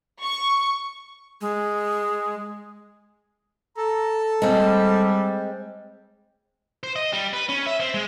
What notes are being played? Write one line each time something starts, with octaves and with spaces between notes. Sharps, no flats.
C#6
G#3
A4 A#5
G3 G#3 C4
C5
D#5
G3
B4
C#4
E5
C4
G#3